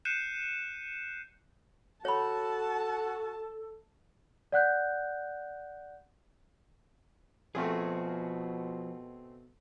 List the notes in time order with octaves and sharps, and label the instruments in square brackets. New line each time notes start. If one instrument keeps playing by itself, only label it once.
[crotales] F#6 G6 C7 C#7 D#7 E7
[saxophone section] F#4 [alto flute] A4 [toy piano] C#5 B5 [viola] A5
[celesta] D5 F#5 F#6 G6
[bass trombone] B2 [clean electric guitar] F3 F4 F#4 [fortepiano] A3 C4 G#4